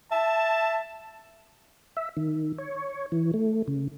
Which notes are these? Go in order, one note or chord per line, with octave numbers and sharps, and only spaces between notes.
E5 A5
E5
D#3
C#5
E3
A3
C#3